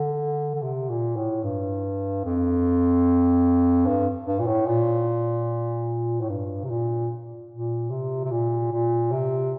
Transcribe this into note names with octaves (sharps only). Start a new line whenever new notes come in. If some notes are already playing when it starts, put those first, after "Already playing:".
Already playing: D3
D3
C3
A#2
A2
G2
F2
G2
G2
A#2
A2
A#2
A2
G2
C3
A#2
A#2
C3
C3
A#2
A#2
C3